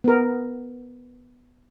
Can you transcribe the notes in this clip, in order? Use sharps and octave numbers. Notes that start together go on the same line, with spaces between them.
B3 A#4